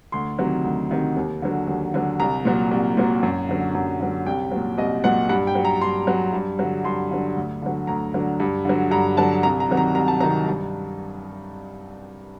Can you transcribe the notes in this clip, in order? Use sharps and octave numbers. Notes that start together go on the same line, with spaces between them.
D2 C6
C3 D#3 F#3
D2
C3 D#3 F#3
D#2
D3 F#3
D#2
D3 F#3
C2 A#5
A#2 F#3
C2
A#2 F#3
F#2
D3 F#3
F#2
D3 F#3
C2 G5
A#2 F#3
C2 D#5
A#2 F#3 F#5
G2 F#5
G5
F#3
A#5
G2 C6
F#3
G2
D3 F#3
G2 C6
D3 F#3
D2
D3 F#3
D2 A#5
D3 F#3
G2
D3 F#3
G2 A#5
D3 F#3 A5
C2 A#5
A#5
C3 D#3 F#3
A#5
C2 A#5
A5
C3 D#3 F#3 A#5
G2